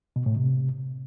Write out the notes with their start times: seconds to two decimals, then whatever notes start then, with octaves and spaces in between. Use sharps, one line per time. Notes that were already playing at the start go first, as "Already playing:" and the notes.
0.16 B2
0.26 A2
0.36 C3